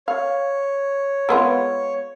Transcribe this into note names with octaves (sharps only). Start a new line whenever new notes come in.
C#5 F5
G#3 B3 F4